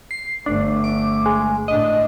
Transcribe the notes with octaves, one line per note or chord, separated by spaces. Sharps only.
C7
G1 A3 D4
D6
G#3
A2 D4 D#5